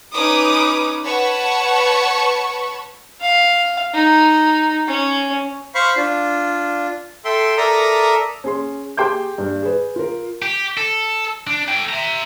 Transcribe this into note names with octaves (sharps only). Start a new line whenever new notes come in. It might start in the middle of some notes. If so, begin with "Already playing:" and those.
C#4 D#4 B4 D6 D#6
B4 C#5 F#5 A5 B5 C#6
F5
D#4
C#4
C5 F5 B5 C#6
D4 F4
A4 E5 G5 C6
A4 A#4 D5 E5 A#5 D#6
C#4 G#4 C6
G4 G#4 G5 C6 D6 G6
G2
G#4 B4
F4 A#4
G4
A4
D4
A4 G5
E5 A#5